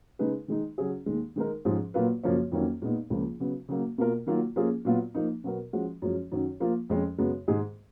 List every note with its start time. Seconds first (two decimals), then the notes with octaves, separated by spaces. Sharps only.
0.19 C#3 G#3 D#4 G#4 B4
0.48 D#3 G#3 D#4
0.78 C#3 F#3 C#4 G#4
1.06 D#2 D#3 G#3
1.36 D#3 G#3 D#4 A#4
1.65 G#2 F3 G#3 C#4 G#4
1.94 A#2 F#3 A#3 F4 B4
2.24 F#2 C#3 F3 A#3 C#4
2.52 F2 D#3 F#3 A#3 C#4
2.82 A#2 G#3 B3 D#4
3.10 C#2 C#3 F3 A#3
3.40 C#3 F#3 B3 F#4
3.69 C#3 F#3 A#3
3.98 B2 A#3 F4 A#4
4.26 D#3 F#3 A#3 F4
4.56 F3 A#3 C#4 F4 G#4
4.85 A#2 F#3 B3 F4
5.15 F3 A#3 D#4
5.44 B2 F#3 B3 F#4 A#4
5.73 F3 G#3 C#4 F#4
6.02 F#2 F3 G#3 C#4
6.31 F#2 D#3 F#3 C#4
6.60 F3 A#3 F4
6.90 F2 F3 G#3 C#4
7.18 F#2 C#3 G#3 B3
7.47 G#2 D#3 G#3 D#4 G#4